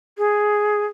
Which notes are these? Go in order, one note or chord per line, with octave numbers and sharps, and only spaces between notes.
G#4